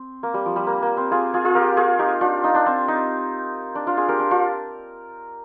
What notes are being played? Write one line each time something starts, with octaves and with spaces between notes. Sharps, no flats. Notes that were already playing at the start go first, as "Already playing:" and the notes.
Already playing: C4
A#3
G3
F3
G3
A#3
A#3
C4
F4 G#4
F4 G#4
F4 G#4
G4 A#4
F4 G#4
D#4 G4
D4 F4
D#4
D4
C4
D#4
D4
D4 F4
F4 G#4
G4 A#4
D4
D4 F4